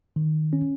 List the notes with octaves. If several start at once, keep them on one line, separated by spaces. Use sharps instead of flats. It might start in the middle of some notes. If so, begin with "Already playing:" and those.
D#3
C#4